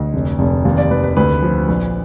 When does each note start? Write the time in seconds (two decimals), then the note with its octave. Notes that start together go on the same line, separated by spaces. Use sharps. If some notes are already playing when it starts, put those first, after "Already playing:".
Already playing: D2 D#5
0.14 F1
0.39 F1
0.65 D#2 F5
0.78 D5
0.91 D#2 B4
1.04 B4
1.17 D2 B4
1.42 F3
1.68 A#1